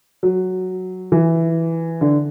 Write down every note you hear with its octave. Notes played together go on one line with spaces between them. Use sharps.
F#3
E3
D3